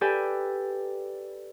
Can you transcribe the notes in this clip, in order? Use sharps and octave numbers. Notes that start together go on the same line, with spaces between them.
G4 A4 B4 D5 G5 G#5